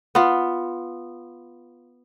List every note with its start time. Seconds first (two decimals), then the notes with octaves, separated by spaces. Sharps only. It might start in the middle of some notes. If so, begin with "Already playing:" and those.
0.15 B3 F4